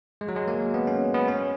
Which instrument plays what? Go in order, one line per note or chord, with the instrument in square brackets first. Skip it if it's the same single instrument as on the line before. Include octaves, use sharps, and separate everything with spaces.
[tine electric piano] G#3
F#3
G#3
A#3
B3
C#4
B3
C#4